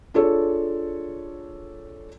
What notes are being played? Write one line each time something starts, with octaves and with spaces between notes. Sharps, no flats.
D4 F4 G#4 A4 C#5